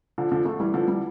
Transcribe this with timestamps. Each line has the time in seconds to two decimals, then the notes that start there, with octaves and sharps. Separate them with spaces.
0.18 D3 F3
0.32 D3 F3
0.45 F3 A3
0.60 E3 G3
0.74 D3 F3
0.88 E3 G3